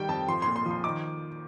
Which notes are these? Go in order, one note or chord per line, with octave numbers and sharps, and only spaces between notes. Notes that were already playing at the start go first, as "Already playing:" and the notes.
Already playing: D#3 G3 G5
F2 A5
F3 C6
A#2 C6
C6
F3
C6
D#3 D6